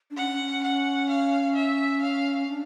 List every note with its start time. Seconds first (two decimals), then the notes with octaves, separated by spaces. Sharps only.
0.10 D4
0.17 C#4 F#5
0.63 F#5
1.09 F5
1.55 E5
2.01 F5
2.47 D4